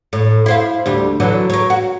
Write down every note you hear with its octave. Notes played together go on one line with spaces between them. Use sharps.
A2
E4 C5 F5
D2 G3
D3 E3 F#3
A#4 C#5
F#4